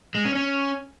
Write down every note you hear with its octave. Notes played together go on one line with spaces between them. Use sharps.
G#3
C#4
C#4